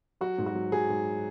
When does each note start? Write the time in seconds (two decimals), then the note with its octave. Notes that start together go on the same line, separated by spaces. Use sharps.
0.21 F#3 F#4
0.38 G#2
0.46 F#4
0.55 F#3
0.72 F#3 G#4
0.89 G#2